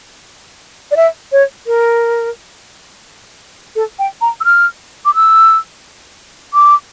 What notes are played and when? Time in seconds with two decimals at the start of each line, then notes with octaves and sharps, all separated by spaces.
0.91 D5
0.96 E5
1.32 C#5
1.67 A#4
3.75 A4
3.99 G5
4.21 A#5
4.40 E6
4.45 F6
5.05 D6
5.15 E6
6.54 D6